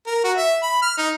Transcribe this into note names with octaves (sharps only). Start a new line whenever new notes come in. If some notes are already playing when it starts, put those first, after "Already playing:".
A#4
F#4
E5
B5
F6
D#4